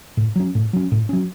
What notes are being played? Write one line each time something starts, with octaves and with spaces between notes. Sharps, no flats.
A2
F#3 C#4
A2
F#3 C#4
A2
F#3 C#4